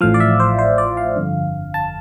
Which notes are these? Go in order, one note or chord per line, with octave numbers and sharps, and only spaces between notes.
A1 A2 F3 F5
D5
E5
C5
C5
D5
F5
G1 F2 D3
A5